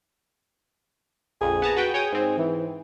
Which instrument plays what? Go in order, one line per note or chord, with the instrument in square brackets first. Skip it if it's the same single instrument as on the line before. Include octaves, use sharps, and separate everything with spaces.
[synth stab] A#1 F2 [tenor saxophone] G#4
[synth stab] B3 A5 A#5
F#4 B4 G5
[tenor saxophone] G#4 [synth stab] C#5 G5 D#6
[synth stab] G#2 C4
[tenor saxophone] E3